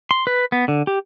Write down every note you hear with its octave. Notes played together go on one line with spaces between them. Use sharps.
C6
B4
B3
D3
G4